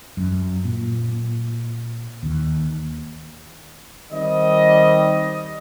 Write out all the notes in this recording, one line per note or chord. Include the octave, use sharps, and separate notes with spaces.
F#2
A#2
D#2
D#3 G3 C4 D#5